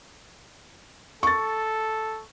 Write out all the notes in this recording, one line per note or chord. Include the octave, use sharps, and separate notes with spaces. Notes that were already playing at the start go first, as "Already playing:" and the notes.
A4 C#6 A6